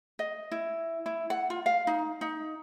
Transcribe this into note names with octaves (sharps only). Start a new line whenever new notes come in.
D#5
E4
E4
F#5
F4
F5
D#4
D#4